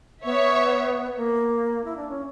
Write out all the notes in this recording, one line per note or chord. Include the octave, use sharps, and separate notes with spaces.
B3 C#5 E5
A#3
E4
D4
C#4